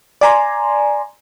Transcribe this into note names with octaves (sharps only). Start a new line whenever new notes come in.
D5 G#5 A#5 C6